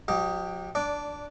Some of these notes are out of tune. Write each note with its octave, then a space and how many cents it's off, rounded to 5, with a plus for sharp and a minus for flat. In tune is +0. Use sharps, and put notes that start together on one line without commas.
F#3 -45 G4 +0 D#5 +10
D4 +0 D5 -15